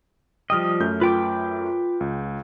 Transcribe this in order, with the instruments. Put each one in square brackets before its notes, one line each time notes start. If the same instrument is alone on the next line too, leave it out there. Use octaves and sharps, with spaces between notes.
[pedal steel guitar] F3 G3 D#5 [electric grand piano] G5 D#6 F6
[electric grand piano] F#2 A3 G6
[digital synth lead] F4 [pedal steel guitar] B4 G5 D6
[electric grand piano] C#2